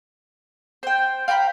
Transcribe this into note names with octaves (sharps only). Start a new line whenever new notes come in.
C5 G5
F5 G5 A#5 B5